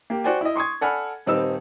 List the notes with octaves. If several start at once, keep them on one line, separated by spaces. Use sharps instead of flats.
A#3 G4
F#4 C5 D5 G5 G#5
E4 D#5
C6 C#6 D#6 G#6
A4 D5 F#5 G#5 B5 F6
D#1 G3 C4 D#4 B4 E6